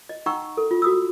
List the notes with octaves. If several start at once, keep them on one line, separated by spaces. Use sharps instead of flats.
D#5
D#4 F#5 G5 A#5 C#6 E6
A4
F4
F#4 D#6 E6